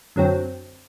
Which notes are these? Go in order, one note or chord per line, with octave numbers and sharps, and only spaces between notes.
F#2 D3 F#3 C4